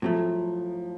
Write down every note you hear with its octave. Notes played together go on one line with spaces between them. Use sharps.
A2 F3 F#3 A3